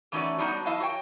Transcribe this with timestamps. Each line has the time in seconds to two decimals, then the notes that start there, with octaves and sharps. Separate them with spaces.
0.12 E3 A3 C#4 D#4 F#4 D5
0.38 F#3 G3 B3 D4 D#4
0.66 F3 E4 D#5 F5 A5
0.80 F#4 C#5 G5